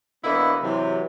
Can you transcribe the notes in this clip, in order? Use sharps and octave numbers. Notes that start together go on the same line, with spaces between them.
F#2 D3 A#3 B3 E4 D#5
C3 E3 F#3